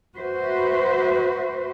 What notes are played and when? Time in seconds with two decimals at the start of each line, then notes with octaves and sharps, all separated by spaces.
0.17 F#4 B4 C5 E5